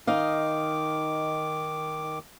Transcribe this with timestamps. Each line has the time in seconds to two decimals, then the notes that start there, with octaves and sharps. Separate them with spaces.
0.07 D#3 D#4 D#5 F5 D6